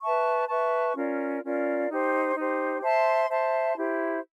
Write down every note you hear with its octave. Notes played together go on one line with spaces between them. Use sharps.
B4 E5 A5 C#6
B4 E5 A5 C#6
C#4 F4 A#4 D5
C#4 F4 A#4 D5
D#4 G4 C5
D#4 G4 C5
C5 E5 A5 C6
C5 E5 A5 C6
E4 G4 C5